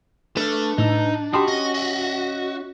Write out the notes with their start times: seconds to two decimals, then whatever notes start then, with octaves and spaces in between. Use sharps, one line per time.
0.37 A3 D4 B4 F6
0.78 A2 D#4 E6
1.33 D#4 F#4 G4 A5 B5 C6 F6
1.48 C#4 D#5
1.75 D#5 E5